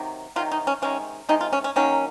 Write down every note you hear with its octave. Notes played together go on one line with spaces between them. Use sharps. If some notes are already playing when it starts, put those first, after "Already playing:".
Already playing: C3 D#3 F#3
C3 D#3 F#3 F4
D#4
C#4
C3 D#3 G#3 C#4
C3 D#3 G#3 D#4
F4
C#4
C#4
D#3 F#3 A#3 C#4